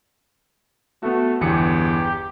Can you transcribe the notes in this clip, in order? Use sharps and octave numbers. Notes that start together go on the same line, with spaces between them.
A3 B3 F#4
G1 E2 G4 C#7